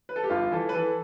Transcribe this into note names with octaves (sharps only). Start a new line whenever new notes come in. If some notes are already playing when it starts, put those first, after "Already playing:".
B4
A4
G4
G1 F4
E3 A4
B4
E3 A4